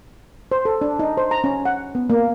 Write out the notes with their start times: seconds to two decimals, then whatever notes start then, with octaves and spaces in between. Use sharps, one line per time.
0.52 C5
0.65 A4
0.81 D4
0.99 D#4
1.17 C5
1.31 A#5
1.44 C#4
1.65 F#5
1.95 B3
2.10 A#3